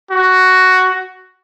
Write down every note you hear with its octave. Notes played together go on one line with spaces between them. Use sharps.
F#4